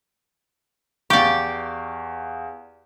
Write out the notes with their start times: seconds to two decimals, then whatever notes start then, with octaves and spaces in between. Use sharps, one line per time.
1.10 E2 G4 D5 F5 C#6